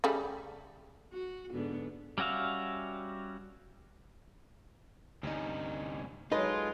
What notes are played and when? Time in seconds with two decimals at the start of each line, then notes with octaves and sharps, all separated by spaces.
0.04 C#3 G3 A3
1.13 F#4
1.52 G#2 D3 B3
2.18 G3 C#4 F#4 E5 F5
5.23 D2 G2 C3 C#4 D#4
6.32 F#3 G#3 D#4 F4 A4 B4 D#5